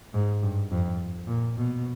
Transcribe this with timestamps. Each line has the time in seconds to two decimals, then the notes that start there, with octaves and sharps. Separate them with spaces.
0.14 G#2
0.42 G2
0.71 F2
1.27 A#2
1.57 B2